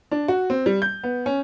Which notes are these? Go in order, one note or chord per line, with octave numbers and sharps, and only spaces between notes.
D4
F#4
C4
G3
G6
B3
C#4